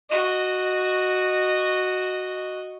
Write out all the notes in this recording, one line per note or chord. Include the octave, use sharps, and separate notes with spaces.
F#4 D#5